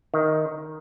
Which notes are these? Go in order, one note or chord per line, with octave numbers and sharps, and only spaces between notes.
D#3